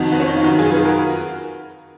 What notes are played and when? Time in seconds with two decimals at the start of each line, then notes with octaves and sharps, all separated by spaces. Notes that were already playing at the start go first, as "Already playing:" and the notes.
Already playing: F2 D#3 D#4 F#4
0.12 B3
0.20 C#4
0.28 D#4
0.36 F4
0.44 F#2 D#3 D#4 F#4
0.59 F4 G#4
0.71 G#4 B4
0.85 F#4 A#4